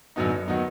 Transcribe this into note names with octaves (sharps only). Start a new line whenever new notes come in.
F#2 D3 F#3 B3 D#4
D#3 F#3 B3 D#4